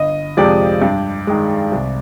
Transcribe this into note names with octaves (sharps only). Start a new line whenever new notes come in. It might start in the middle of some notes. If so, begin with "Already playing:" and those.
Already playing: G1 D#5
F2 C3 F3 G#3 D5
G2
D#3 G#3
C2